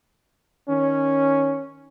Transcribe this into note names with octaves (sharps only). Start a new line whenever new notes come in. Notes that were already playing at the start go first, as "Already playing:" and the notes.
D#3 C#4